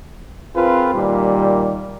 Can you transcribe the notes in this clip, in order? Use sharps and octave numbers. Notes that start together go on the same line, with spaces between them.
C4 F4 G#4 A#4 B4
A#2 D#3 G3